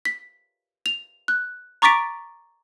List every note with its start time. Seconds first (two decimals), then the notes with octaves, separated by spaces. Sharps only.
0.05 B6
0.86 F7
1.28 F#6
1.82 A#5 C#6 D6 A6 B6 D7